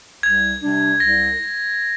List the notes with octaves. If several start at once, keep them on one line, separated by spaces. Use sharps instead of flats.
C2 G#6
C3 G3 D4
C2 A#6